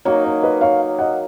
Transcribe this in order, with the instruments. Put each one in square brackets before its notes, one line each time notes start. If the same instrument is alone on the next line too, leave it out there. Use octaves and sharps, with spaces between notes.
[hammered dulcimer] F#3 A#3 D#4 [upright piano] C#5
[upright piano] C#5
B4 D#5
C#5 F5
D#5 F#5